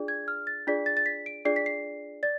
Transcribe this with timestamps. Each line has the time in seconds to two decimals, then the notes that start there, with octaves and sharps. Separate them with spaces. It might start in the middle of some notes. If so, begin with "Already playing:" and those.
Already playing: D4 F4 G#4 D5
0.08 G#6
0.28 F6
0.47 A6
0.67 D4 F4 G#4 D5 B6
0.86 A6
0.97 A6
1.06 B6
1.26 D7
1.45 D4 F4 G#4 D5 C7
1.56 B6
1.66 C7
2.23 D5 A6